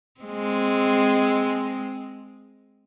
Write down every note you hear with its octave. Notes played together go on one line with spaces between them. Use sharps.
G#3 C4